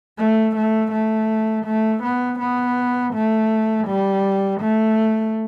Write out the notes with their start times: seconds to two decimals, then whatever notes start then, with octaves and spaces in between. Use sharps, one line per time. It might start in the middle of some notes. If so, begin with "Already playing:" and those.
0.18 A3
0.56 A3
0.92 A3
1.66 A3
2.03 B3
2.39 B3
3.14 A3
3.87 G3
4.61 A3